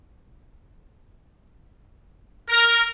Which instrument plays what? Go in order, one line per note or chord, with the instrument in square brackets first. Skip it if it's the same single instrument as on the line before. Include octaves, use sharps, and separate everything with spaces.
[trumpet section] A#4